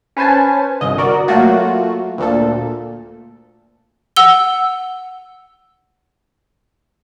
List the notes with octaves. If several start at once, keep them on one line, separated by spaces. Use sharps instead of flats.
C#4 B4 C5 G#5 A5
G1 C2 D#5
F#4 A#4 D5
F#3 A3 A#3 F4 F#4
D2 A#2 A4
F#5 E6 G7